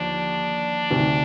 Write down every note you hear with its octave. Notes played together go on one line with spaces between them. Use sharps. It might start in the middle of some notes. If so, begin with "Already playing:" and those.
Already playing: D#2 D3 F3 D4
D2 C3 D#3